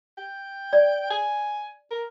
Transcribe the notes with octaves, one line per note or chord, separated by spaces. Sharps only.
G5
D5
G#5
A#4